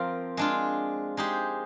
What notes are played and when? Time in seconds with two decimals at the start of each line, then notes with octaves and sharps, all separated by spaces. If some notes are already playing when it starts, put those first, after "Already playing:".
Already playing: F3 C4 F4 A#4
0.37 G#3 D4 F4
1.17 G#3 D#4 G4 C5